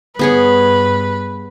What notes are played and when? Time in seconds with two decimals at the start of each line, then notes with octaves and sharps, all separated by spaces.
0.19 G2 B3 G#4 B4 C#5